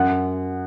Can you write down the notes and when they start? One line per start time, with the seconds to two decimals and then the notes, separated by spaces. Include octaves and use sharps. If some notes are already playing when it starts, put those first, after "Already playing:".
Already playing: F#2 F#5